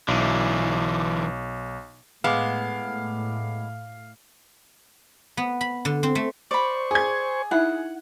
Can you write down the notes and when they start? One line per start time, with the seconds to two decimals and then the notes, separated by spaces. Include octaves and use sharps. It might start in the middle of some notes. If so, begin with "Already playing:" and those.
0.08 B1 D3 E3
2.24 A2 G#3 B3 F5 D6
5.37 B3
5.61 B5
5.85 D3
6.03 C4
6.15 A3
6.51 C5 D5 B5 C#6
6.91 G#4 G#6
7.51 D#4 E4 E5 F#5